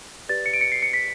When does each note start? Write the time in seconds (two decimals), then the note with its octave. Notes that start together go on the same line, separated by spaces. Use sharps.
0.29 G4 B4 D5 A6
0.46 C#7
0.53 D7
0.61 C#7
0.72 C7
0.82 C#7
0.94 B6